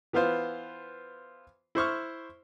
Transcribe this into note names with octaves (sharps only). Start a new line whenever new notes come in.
E3 B3 F4 C5
E4 C5 C#6 F6